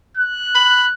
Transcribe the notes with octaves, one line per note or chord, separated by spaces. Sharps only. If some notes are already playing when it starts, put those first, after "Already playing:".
F#6
B5